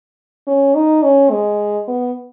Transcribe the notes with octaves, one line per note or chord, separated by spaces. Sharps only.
C#4
D#4
C#4
G#3
B3